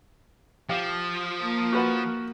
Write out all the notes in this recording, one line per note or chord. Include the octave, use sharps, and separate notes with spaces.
F3 G4 F5
A#3
F#4 B4 F#5